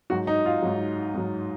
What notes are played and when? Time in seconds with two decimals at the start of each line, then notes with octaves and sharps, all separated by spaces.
0.10 G#2 F#3 F#4
0.27 D#4
0.45 F4
0.62 G#2 F#3
1.14 G#2 F#3